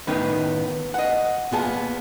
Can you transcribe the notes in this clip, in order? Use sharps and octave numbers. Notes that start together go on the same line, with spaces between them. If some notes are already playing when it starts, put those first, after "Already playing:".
A2 D#3 B3 C#4 D#4 B4
D#5 F#5
A#2 B3 G#4 A5